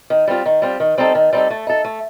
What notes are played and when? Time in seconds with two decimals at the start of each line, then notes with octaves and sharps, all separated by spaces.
0.10 D#3
0.27 G3 C4 F4
0.46 D#3
0.62 G3 C4 F4
0.80 D#3
0.98 G3 C4 D#4 A4
1.15 D#3
1.33 G3 C4 D#4 A4
1.50 A3
1.67 D#4 A4
1.84 A3